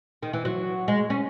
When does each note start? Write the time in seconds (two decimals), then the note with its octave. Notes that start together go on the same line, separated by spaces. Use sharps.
0.23 D#3
0.33 E3
0.45 F#3
0.88 G#3
1.10 C#4